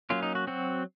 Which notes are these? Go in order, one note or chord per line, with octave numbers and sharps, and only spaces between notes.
F#3 A#3 C#4 F4
D#4
F#4
F#3 C4 F#4